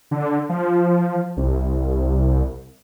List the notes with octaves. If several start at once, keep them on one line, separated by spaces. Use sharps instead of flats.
D3
F3
C2